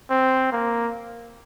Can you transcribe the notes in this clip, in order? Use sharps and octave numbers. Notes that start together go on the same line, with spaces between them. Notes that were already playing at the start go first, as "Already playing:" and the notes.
C4
A#3